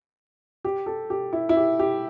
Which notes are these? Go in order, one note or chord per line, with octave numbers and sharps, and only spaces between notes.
G4
A4
G4
E4
E4
G4
G4